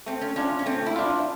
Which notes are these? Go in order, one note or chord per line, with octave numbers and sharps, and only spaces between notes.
A3 C4
C#4
C#4 D4 F4
C#4
A3 C4
E4
D4 F4